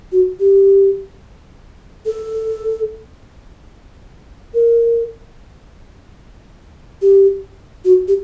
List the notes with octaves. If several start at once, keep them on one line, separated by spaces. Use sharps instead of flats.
F#4
G4
A4
A#4
G4
F#4
G4